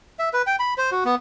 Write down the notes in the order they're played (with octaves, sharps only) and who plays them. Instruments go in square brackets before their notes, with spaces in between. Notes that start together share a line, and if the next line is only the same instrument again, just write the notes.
[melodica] E5
B4
G5
B5
C5
F#4
B3